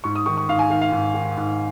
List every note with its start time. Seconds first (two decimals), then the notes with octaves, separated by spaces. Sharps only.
0.04 G#2 C#6
0.15 D#6
0.26 D#3 C#6
0.37 C#6
0.49 G#2 F5
0.59 G#5
0.70 D#3 F5
0.81 F5
0.92 G#2
1.14 D#3
1.37 G#2